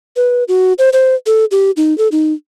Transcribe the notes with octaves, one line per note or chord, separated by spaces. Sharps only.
B4
F#4
C5
C5
A4
G4
D#4
A4
D#4